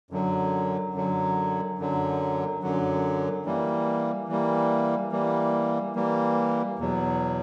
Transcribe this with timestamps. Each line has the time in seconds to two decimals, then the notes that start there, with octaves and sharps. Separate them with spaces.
0.11 F#2 D3 F#3
0.94 F#2 D3 F#3
1.79 F#2 D3 F#3
2.62 F#2 D3 F#3
3.45 E3 G3 A#3
4.28 E3 G3 A#3
5.12 E3 G3 A#3
5.95 E3 G3 A#3
6.79 E2 B2 F#3